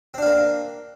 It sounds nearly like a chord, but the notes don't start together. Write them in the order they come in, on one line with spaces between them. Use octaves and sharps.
C4 D4 F4 A#3